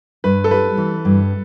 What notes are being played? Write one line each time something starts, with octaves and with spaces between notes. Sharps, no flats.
G2 B4
A4
G3 B4
E3
G2